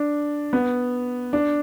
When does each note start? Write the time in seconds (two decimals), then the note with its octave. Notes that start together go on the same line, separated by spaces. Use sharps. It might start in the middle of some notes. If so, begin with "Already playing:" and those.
Already playing: D4
0.53 B3
1.33 D4